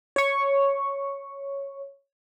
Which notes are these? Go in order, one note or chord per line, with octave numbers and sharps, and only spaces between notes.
C#5 C#6